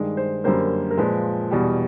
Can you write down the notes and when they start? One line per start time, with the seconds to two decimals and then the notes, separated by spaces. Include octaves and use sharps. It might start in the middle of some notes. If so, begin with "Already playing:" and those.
Already playing: G2 D#3 G#3
0.17 C5
0.44 F#2 D3 G3 A#3 C5
0.91 A#4
0.97 A#2 F3 G#3 B4
1.51 E2 B2 G3